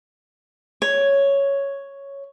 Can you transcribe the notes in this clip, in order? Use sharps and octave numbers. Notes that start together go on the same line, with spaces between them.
C#5